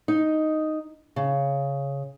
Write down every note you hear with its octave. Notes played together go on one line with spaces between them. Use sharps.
D#4
C#3